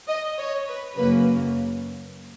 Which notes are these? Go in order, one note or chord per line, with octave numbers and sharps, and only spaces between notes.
D#5
C#5
B4
F#2 C#3 F#3 A#3 B4